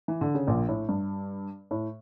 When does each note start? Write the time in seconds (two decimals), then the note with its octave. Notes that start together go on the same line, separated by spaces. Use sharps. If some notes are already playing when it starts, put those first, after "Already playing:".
0.08 E3
0.21 D3
0.35 C#3
0.47 A#1 A#2
0.68 A2
0.89 G2
1.71 A2